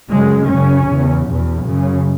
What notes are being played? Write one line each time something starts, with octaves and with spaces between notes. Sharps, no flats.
F#2 C#3 G#3
F#2 C#3 C#4
E2 C#3
E2 B2
F#2 C#3